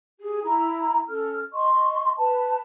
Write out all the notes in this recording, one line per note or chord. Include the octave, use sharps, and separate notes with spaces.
G4 G#4
E4 A#5
C#4 A4 F6
D#5 C6 C#6
B4 A5